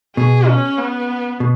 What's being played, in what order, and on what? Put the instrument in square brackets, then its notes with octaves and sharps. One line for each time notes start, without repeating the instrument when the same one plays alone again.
[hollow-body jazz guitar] B2 [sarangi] G#4
[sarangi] C#4
B3
[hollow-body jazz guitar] B2